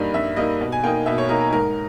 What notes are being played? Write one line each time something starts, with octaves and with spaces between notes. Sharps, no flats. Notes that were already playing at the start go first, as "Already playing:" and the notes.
Already playing: G2 G3 A#3 D#4
G2 E5
G3 A#3 D#4 D#5
B2
G#5
A#3 D#4 G5
B2 E5
C#5
A#3 D#4 A#4
A#4
G#2 A#4